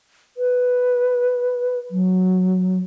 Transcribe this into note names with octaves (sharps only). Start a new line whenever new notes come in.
B4
F#3